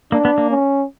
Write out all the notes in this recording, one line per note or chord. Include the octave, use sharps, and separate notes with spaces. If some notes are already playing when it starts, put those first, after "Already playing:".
A#3 D4
B3
A#3
C#4